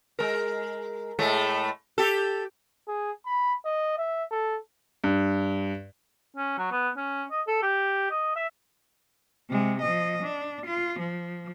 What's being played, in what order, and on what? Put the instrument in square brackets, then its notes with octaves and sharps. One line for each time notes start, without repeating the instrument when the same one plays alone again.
[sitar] G#3 A#4
A2 G#3 A3
G4 A4
[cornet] G#4
B5
D#5
E5
A4
[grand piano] G2
[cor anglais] C#4
F#3
B3
C#4
D#5
A4
G4
D#5
E5
[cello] C3 G#3
F3 D#5
D4
F4
F3